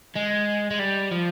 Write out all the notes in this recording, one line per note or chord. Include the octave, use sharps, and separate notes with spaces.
G#3
G#3
G3
F3